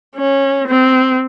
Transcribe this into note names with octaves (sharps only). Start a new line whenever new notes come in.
C#4
C4